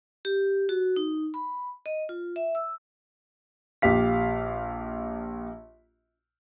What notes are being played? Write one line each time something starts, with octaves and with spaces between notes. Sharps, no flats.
G4
F#4
D#4
B5
D#5
F4
E5
E6
A#1 G4 F5 B6